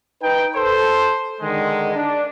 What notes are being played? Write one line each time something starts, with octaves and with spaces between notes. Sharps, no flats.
D#4 B4 G5
A4 C5
D3 D#3 G#3
D4